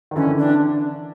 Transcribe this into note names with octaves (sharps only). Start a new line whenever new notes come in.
D#3
D3 E3 C#4
D4